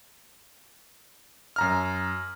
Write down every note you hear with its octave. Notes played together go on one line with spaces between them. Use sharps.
F#2 A#5 F6